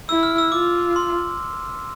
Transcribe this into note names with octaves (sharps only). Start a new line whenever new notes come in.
E4 E6
F6
E6
F4 D6
C6